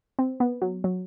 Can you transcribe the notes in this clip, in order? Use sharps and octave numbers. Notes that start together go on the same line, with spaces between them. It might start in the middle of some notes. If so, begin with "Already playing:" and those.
C4
B3
F#3
F#3